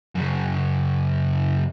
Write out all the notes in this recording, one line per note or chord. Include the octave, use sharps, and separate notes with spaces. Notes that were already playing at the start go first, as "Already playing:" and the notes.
F#2 C#3